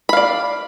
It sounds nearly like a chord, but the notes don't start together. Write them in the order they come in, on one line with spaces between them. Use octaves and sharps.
B5 F5 D5